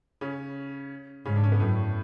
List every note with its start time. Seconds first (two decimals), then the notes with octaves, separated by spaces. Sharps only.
0.21 C#3 C#4
1.26 G#2 C#3 C#4
1.36 D4
1.44 C#4
1.52 B3
1.60 F#2 A2 A3